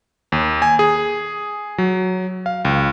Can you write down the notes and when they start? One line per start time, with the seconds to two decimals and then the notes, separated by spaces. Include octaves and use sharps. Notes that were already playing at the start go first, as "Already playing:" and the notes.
0.32 D#2
0.62 G#5
0.79 G#4
1.78 F#3
2.46 F5
2.65 C#2